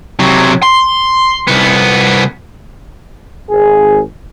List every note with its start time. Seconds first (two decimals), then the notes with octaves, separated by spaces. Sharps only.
0.19 C3 F#3
0.63 C6
1.48 C2 B3
3.49 G#1 G#4